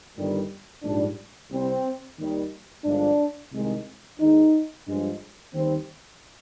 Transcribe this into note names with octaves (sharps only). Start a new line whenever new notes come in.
G1 G2 D#3 G3
A#1 G#2 G3 D4
C2 C3 G3 C4
D#2 D#3 G3
G1 G2 F3 G#3 D4
C2 C3 D#3 G#3
D#2 D#3 G#3 D#4
G2 F3 G#3
D#2 D#3 G3 C4